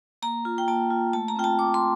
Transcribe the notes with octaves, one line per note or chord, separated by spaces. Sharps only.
A#3 A#5
F4
G5
A#3 A5
F4
A3 A5
A#5
C4 F4 G5
A5
A3 D6
C6